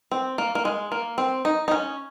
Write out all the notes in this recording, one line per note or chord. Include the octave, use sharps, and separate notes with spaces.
C4
A#3
A#3
G#3
A#3
C4
D#4
D#4
C#4